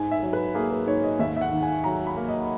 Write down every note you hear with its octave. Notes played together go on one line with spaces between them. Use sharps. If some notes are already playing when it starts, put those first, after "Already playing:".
Already playing: G#2 G#5
E5
F#3
B4
A#3 G#4
B4
G#2 C#5
D#5
D#2 E5
E5
F#5
D#3
G#5
F#3 A#5
B5
A#3
D#5